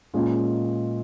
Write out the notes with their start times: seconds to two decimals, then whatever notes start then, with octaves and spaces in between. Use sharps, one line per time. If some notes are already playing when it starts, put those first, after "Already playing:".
0.14 A#2 G#3 C#4 F4